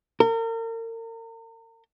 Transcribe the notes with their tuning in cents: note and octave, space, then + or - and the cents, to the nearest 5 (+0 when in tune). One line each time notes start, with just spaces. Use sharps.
A#4 -40